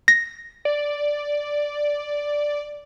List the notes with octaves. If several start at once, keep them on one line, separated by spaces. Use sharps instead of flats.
A#6
D5